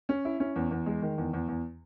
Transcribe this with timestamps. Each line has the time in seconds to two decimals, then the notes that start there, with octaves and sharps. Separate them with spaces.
0.09 C#4
0.25 E4
0.40 C#4
0.56 E2
0.71 E2
0.86 G#3
1.02 D#3
1.18 E2
1.34 E2
1.48 E2